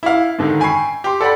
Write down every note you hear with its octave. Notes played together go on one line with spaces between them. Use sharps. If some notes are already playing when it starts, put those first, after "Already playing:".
E4 F5
G#2 D3 D#3
G5 G#5 B5 C#6 C7
G4 C6
A4 D5 F#5 B5